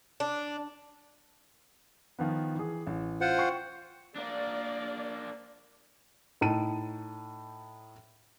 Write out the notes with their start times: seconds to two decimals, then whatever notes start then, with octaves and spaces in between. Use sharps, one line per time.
0.20 D4
2.19 D#3 F3 B3
2.55 E3 G#4
2.87 A1
3.21 F4 C5 F#5
3.37 G5 C#6 C7
4.16 A#3 D4 D5
6.41 A2 D#4 A5 D#7